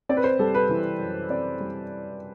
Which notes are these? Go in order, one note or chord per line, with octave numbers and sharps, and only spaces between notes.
C4 D5
B4
C5
G3 A4
B4
E3
F#2
C4 D5
G3